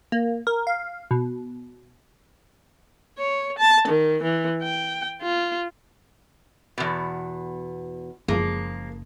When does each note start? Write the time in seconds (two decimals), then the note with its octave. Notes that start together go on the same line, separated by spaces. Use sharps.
0.12 A#3
0.47 A#4
0.67 F5
1.11 B2
3.18 C#5
3.58 A5
3.88 D#3
4.23 E3
4.63 G5
5.22 F4
6.78 E2 B2
8.28 F#1 F3 G#3 A#3